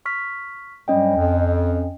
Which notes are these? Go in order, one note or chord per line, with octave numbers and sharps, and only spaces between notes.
C#6 F6 B6
G2 F#3 G3 C#4 D#5 G5
F2